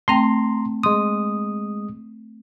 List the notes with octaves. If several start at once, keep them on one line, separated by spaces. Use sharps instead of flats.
A3 C4 G5 A#5 C6
G#3 C6 D#6